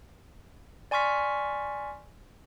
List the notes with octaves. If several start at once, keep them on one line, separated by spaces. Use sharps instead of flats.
D5 G#5 C6 C#6 F6 B6